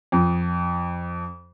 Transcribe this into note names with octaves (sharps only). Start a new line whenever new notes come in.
F2